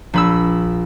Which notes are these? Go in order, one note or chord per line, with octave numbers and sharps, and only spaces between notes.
A#1 B5 E6